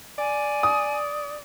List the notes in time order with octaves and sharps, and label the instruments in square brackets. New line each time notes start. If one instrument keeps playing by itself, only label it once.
[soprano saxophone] D5 [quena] G#5
[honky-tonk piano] D#6